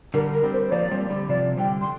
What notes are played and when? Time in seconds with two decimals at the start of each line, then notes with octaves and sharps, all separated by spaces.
0.14 D3 G3 A#4
0.33 A#4
0.44 G3 C4
0.53 C5
0.66 C5
0.71 F3 A#3 D5
0.91 G3 C4
1.10 D3 G3
1.29 C3 F3 D5
1.58 D3 G3 G5
1.81 C6